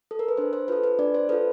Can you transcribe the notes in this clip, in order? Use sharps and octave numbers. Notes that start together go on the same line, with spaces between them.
A4
A#4
B4
D4 C5
C5
F4 A4 B4
B4
D4 D5
C5
F4 A4 B4